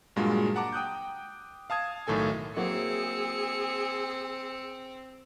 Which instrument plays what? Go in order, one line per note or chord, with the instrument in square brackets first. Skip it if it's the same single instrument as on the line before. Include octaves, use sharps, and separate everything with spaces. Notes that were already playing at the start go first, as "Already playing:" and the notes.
[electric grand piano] G2 A#2 F#3 G#3 F4 F#4
F#5 A5 A#5 D6
G5 D#6 F#6 G6
F5 A5 D#6 G#6
B1 A2 D#3 A4 G#5
[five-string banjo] F#3 A#3 E4 [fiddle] C4 [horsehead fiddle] G#4 [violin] E6 C#7